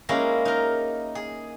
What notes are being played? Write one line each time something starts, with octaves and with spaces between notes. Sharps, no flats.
G#3 A#3 C#4 D#4 E4
D#4 A#4
G#4